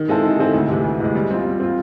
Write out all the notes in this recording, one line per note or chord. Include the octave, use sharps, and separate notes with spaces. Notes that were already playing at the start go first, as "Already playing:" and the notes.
Already playing: D#3
G#3 C4 E4 A4
D#3
G#3 C4 E4 A4
D2
C3 E3 G#3
D2
C3 E3 G#3
G3
C4 F4
G3
C4 F4